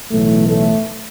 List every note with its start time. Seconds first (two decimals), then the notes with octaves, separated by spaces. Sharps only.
0.11 B1 A2 E3 A3
0.48 A3